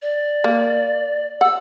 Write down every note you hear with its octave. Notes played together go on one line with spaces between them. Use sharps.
D5
A#3
F#5 E6